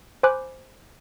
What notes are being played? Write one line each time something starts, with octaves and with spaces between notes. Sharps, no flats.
C5 G#5 B5 D6 F#6